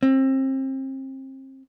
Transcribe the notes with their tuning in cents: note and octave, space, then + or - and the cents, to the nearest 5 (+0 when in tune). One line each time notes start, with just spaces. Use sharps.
C4 +30